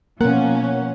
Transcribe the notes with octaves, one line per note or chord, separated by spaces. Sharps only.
B2 F3 A#3 C#4 A#4 F#5